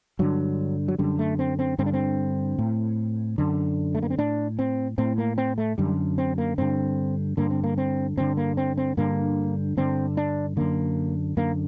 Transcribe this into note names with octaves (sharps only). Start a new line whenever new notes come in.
G2 D3 F#3
F#3
F#2 D3 G3
A3
C4
C4
G2 D3 C4
D4
C4
A2
F#2 D3
A3
A#3
C4
A2 D4
C4
A2 C4
A#3
C4
A3
F#2 D3 G3
C4
A#3
G2 D3 C4
G2 D3 A#3
C4
A#3
C4
G2 D3 C4
A#3
C4
C4
G2 D3 A#3
G2 D3 C4
D4
F#2 D3 A#3
F#2 D3 A#3